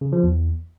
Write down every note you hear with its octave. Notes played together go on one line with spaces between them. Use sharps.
C#3
F3
E2